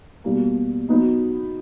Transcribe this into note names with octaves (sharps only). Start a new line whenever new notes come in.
B2 G3 A#3
F#3 B3 D#4